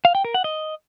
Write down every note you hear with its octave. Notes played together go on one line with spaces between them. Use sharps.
F5
G5
A#4
F#5
D#5